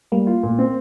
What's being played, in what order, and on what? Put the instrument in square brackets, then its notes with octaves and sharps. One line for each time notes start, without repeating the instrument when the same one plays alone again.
[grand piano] G3 [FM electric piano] A#3
[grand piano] F4
A#2
C4